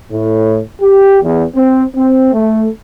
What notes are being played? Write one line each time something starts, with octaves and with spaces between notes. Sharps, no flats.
A2
G4
E2
C4
C4
A3